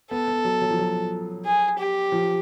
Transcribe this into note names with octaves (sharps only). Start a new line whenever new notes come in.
B3 A4
B3
F#3
F#3
F3
F#3
G#4
G4
F3